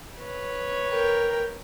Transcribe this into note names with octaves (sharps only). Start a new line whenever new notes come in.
B4 C#5
A#4 G5